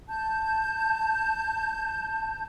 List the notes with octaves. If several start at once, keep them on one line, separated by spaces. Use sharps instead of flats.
A5 G6